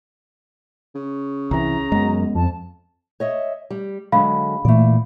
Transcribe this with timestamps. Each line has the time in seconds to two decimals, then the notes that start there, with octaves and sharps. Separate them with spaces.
0.95 C#3
1.51 C2 E3 A#5
1.92 F#2 G#3 B3
2.35 F2 A5
3.20 C#5 D#5 E5
3.70 G3
4.12 D3 F#3 G#3 F5 B5
4.65 A#2 E3 A3 A#3 D5